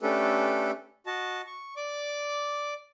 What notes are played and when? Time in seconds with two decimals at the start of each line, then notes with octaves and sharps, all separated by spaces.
0.01 A3 C#4 D4 G4 A4 B4
1.06 F#4 D#5 A5
1.47 C#6
1.76 D5 D6